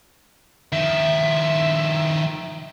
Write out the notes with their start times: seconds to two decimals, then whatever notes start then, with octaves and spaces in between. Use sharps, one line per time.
0.73 D#3 F3 E5